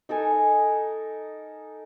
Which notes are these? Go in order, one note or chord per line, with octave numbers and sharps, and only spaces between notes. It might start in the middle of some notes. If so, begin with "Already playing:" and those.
D#4 A4 A#4 G#5